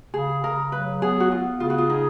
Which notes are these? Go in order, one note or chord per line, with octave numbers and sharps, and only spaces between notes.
C#3 G#4
C#3 A#4
F#3 B4
B3 G#4
F#4
B3 F4
C#3 F4
F#4
F4
D#4 G#4